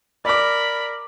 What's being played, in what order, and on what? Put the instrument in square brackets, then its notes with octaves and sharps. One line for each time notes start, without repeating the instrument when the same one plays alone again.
[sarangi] A#4 [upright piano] D5 D6 [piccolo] B5